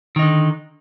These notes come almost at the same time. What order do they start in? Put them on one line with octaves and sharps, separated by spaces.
D#3 D#4 D3